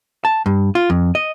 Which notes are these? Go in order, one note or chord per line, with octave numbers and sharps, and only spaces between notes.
A5
G2
F4
F2
D#5